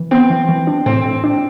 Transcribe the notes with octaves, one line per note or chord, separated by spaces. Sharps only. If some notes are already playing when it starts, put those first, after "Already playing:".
Already playing: E3
B3 C4
E3
E3
D4
A2 C4
A2
D4